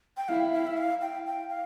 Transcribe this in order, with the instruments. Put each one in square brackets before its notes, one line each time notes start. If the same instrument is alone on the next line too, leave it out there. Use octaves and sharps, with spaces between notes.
[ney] G5
[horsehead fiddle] E4 [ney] F5
[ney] F5
E5
F5
G5
G5
F5